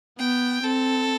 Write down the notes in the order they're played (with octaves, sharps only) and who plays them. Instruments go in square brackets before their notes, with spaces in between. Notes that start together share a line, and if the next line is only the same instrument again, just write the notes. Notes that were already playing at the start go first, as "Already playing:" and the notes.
[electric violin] B3 [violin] G5
[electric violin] C4 [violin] A4